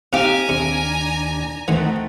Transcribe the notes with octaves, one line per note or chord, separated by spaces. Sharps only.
C3 D#4 G4 F5 G#5 A#5
D#2 C3 D4
D2 E3 A3 C4 D#4 A#4 F#5